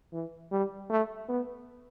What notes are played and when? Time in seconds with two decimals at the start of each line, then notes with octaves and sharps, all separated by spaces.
0.12 E3
0.51 G3
0.90 A3
1.29 B3